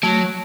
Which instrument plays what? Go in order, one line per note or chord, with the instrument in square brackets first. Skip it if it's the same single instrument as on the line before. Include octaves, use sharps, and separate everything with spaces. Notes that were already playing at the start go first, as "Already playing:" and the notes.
[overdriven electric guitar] F#3 [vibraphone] A3